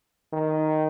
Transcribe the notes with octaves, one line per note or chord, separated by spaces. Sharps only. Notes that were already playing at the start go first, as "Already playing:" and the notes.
D#3